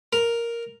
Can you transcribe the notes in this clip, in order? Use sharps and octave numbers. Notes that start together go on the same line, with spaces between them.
A#4